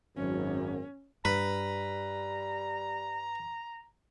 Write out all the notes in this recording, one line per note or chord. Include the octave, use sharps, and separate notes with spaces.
G#1 F#2 C#4
G2 G3 B4 A#5